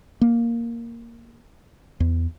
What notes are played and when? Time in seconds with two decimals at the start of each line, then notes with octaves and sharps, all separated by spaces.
0.21 A#3
2.00 E2